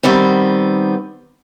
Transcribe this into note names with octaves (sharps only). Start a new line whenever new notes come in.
D#3 G3 B3 C4